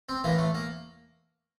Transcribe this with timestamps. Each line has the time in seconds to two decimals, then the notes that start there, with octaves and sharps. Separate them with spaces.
0.09 C4
0.24 A2 E3 A#3
0.38 A3
0.54 A#3